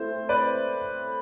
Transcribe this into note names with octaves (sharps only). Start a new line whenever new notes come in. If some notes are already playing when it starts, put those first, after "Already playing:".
Already playing: A3 C4 E4 C5
B4 D5